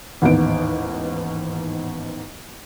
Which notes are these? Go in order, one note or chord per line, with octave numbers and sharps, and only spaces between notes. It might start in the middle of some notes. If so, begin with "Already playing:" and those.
A1 D#2 G#2 B3 D7